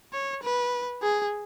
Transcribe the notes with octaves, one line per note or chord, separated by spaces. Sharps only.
C#5
B4
G#4